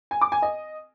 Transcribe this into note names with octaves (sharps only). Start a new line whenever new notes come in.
G#5
D6
G#5
D#5